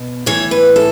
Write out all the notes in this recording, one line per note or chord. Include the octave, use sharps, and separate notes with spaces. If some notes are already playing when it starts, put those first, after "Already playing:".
Already playing: B2
A2 E3 C#5
B4
A4